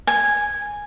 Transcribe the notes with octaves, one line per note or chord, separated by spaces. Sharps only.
G#5